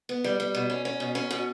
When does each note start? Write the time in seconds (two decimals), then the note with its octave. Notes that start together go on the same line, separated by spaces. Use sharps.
0.09 B3
0.24 G3
0.40 G3
0.54 B2
0.70 C#4
0.85 C#4
1.00 B2
1.15 C#4
1.31 B2